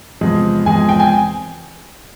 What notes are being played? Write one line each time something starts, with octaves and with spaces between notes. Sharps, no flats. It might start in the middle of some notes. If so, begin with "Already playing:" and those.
E2 C3 F3 G#3
E2 C3 F3 G#3 G#5
G#5
G5
G#5